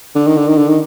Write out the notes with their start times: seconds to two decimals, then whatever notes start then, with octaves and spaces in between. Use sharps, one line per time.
0.15 D3
0.27 D#3
0.37 D3
0.48 D#3
0.57 D3
0.68 D#3